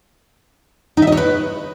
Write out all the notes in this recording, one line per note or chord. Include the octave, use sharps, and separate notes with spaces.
D#4
E5
D#5
C#5
B4